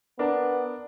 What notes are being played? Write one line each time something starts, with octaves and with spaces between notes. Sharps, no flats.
B3 D4 A#4